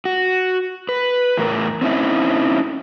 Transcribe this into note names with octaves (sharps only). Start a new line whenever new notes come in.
F#4
B4
E2 A2 A#4
C4 C#4 D#4 E4